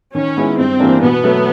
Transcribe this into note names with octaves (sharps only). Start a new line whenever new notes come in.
D#3 C#4
G#3 B3 E4
G2 C4
E3 G3 A#3 D4
B2 B3
F#3 A3